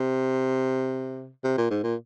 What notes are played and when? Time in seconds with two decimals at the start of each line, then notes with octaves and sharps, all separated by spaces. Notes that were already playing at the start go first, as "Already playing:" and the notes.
Already playing: C3
1.44 C3
1.58 A#2
1.70 G#2
1.83 A#2